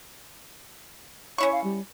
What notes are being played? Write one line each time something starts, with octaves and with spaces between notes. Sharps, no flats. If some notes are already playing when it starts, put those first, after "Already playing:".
C#4 E4 C#5 C#6
F5
G3